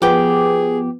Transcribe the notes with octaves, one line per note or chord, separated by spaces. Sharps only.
F3 B3 G4 G#4 G5 D6